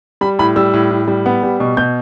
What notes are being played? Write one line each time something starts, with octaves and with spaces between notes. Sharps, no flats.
G3 B5
A2 B5
G3 E6
A2
A2
G3
B3
G3
B2
B2 G6